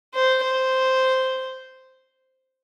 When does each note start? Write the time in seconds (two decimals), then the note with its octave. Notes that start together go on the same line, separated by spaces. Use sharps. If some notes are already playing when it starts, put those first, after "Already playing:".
0.14 C5
0.43 C5